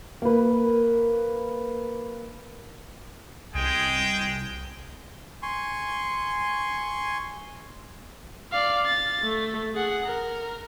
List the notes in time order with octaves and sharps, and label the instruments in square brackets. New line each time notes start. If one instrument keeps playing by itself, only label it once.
[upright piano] A#3 B4
[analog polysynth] C2 [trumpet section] G#3 G#4 G5
[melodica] G#5 C6 C#6
[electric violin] D5 F5
A6
A3
G#4 F#5
A#4